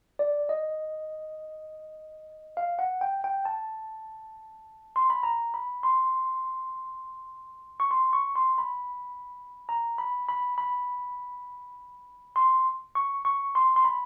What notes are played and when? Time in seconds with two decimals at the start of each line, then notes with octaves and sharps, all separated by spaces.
0.19 D5
0.49 D#5
2.57 F5
2.79 F#5
3.01 G5
3.24 G5
3.45 A5
4.96 C6
5.10 B5
5.23 A#5
5.54 B5
5.83 C6
7.80 C#6
7.91 C6
8.13 C#6
8.36 C6
8.58 B5
9.69 A#5
9.98 B5
10.29 B5
10.58 B5
12.36 C6
12.95 C#6
13.25 C#6
13.55 C6
13.76 C6
13.85 B5